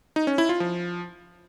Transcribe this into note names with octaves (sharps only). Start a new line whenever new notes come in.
D#4
C#4
E4
F4
F3